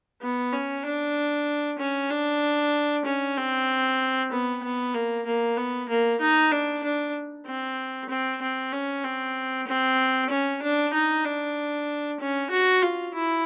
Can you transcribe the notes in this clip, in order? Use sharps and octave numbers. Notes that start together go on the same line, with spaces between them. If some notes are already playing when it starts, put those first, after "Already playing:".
B3
C#4
D4
C#4
D4
C#4
C4
B3
B3
A#3
A#3
B3
A#3
D#4
D4
D4
C4
C4
C4
C#4
C4
C4
C#4
D4
D#4
D4
C#4
F#4
F4
E4